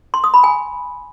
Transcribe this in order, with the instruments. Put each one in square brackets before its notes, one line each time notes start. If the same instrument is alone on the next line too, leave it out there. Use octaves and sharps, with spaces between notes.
[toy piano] C6
D#6
B5
G#5